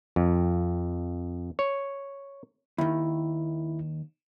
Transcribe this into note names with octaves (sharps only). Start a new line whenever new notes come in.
F2
C#5
D#2 D#3 E4